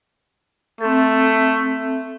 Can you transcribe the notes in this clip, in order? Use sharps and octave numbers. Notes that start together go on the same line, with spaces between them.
A3 C4 A4